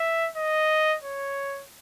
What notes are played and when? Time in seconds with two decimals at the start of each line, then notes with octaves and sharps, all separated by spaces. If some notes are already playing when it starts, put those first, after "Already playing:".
Already playing: E5
0.36 D#5
1.03 C#5